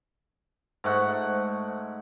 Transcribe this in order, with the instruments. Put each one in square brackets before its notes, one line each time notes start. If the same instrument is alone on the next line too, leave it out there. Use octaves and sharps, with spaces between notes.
[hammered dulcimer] G#2 A3 F#5